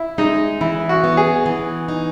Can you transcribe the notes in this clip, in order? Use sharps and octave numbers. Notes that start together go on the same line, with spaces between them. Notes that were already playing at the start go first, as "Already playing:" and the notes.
Already playing: E4
G#3 D#4
E3 E4
F#4
B3
G#4
E3
D#4